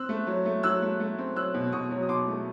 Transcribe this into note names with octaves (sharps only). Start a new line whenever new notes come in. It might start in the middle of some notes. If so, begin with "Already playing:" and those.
Already playing: C4 E6 F#6
A3
F#3
A3
F#3 E6 F#6
A3
A3
C4
F#3 E6 F#6
B2
B2 C#6 D#6
F#3
D#6
B2 C6 D6
A3